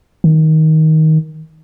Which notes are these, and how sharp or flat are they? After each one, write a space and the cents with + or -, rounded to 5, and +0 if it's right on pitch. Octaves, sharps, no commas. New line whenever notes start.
D#3 +15